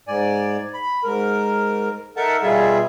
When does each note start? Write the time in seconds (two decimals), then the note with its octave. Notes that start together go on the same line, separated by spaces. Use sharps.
0.07 G#2 D5 G#5
0.74 B5
1.04 G#2 A#4
2.17 D#4 A4 A#4 E5 F#5 A5
2.42 B2 G3 F4 G#4 E5